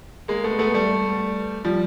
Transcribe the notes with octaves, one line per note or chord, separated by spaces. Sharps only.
G#3 A#3
A3 B3
A3 B3
G3 A3
F3 G3